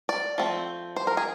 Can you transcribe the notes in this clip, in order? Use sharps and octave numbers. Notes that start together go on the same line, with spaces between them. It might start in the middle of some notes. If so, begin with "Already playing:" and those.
D5
F3 A3 C4
C5
A#4
G#4